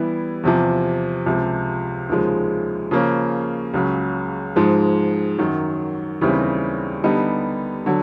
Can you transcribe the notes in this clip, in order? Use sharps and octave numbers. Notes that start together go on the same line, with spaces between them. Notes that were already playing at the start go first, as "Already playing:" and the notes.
Already playing: E3 G3 B3 E4
E2 C3 F3
C#2 C3 F3
D#2 C#3 F3 G#3
C#3 F3 A#3 C#4
C#2 C#3 F#3
G#2 F3 G#3
F#2 D#3 F#3
D#2 C#3 E3 G3 C4
D3 G3 B3 D#4
D3 F#3